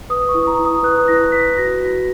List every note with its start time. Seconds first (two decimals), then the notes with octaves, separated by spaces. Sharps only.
0.10 B4 D#6
0.29 C#6
0.34 E4
0.47 A#5
0.59 E4
0.65 D#6
0.83 B4 F#6
1.08 E4 A#6
1.32 B4 B6
1.57 F#4 A#6
1.82 F#4